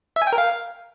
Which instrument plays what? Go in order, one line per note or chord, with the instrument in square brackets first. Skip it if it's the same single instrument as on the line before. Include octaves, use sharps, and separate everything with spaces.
[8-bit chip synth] E5
G#5
G5
A#4
F5